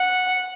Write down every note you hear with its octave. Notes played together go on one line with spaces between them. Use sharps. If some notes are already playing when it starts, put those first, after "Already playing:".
Already playing: F#5